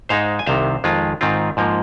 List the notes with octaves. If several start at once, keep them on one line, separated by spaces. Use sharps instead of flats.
G#2 G#3 D#4 C5 F5
G#5
C2 C3 D#3 C5 F5
F2 D#3 G#3 F4
G#2 D#3 C4 F4
G#2 F3 A#3